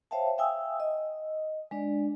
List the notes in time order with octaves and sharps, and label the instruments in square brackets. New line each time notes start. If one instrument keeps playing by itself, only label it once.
[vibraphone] C5 C#5 E5 F5 G5 A5
E5 F5 G5 G#5 D#6 E6
D#5
G#3 D4 D5